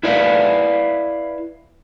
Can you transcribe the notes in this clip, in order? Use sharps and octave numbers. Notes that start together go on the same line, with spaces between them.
E4 B4 D5 E5 F5